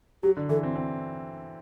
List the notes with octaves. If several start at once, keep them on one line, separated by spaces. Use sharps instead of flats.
F#3 G4
D3
E3 A4
C4
C4